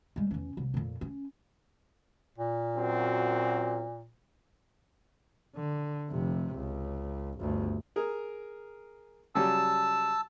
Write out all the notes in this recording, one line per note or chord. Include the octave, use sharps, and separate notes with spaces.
G3 G#3
E2 C#4
C2
F2 A#2
C#4
A#2
F#2 C4 F#4
D3
F1 C3
C#2
G1 D2
G#4 A#4
C#3 F#3 G3 A5 E6